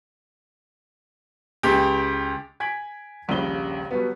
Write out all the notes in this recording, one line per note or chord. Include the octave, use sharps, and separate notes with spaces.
C#2 G4
G#5 G#6 B6 D7 F#7
D#1 A#1 G2 C#3 G7
B2 F#3 G3 B3